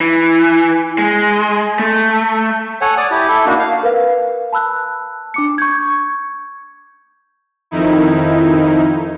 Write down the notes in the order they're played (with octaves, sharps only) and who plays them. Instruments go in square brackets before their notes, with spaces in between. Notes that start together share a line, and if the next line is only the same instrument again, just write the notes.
[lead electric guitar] E3
G#3
A3
[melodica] A4 C#5 F#5 G#5
D5 D#6
E4 G4
E4 A4
A#3 D4 D#4 F#4
F5
[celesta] A#4 B4 F5
A5 B5 E6 F#6
D4 D6 C#7
C#6 G6 G#6
[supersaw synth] F2 D#3 D#4 E4